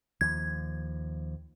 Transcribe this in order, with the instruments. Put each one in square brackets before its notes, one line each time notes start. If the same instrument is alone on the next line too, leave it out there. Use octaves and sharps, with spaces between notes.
[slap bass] D#2 F3 [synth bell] G#6